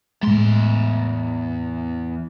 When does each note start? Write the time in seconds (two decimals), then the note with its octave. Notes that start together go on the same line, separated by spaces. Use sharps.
0.23 E2 A2 G#3 C6